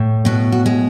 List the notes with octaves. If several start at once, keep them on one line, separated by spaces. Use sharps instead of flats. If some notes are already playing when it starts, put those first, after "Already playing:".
Already playing: A2
B2 F#4
F#4
G#3